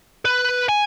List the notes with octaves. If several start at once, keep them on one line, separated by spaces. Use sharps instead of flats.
B4
G#5